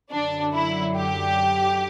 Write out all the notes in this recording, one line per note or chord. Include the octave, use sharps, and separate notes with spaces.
F#2 D3 F#3 D4
E4
G4